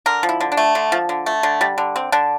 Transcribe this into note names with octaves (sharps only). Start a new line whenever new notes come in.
D3 A#4
F3
E4
D3
D4
A3
D3
F3
D3
A3
D3
G3
D3
C4
D3 D4